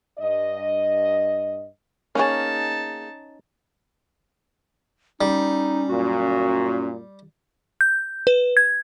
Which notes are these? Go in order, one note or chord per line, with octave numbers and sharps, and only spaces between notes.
G2 D#5
A#3 C#4 D#4 G#4 C#5 A5
G3 C#4 D#4
F#2 A#2 F#4
G6
B4
G#6